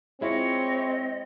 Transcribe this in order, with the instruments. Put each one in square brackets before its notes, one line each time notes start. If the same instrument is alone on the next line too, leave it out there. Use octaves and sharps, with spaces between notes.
[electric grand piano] G#3 E4 F4 [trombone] C4 [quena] C#5 [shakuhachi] D#5